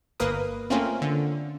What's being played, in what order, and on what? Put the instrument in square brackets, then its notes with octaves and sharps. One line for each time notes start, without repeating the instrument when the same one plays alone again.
[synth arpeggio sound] G1 A#3 A#4 B4 D#6
A3 A#3 C4 C#4 F4 A#4
D3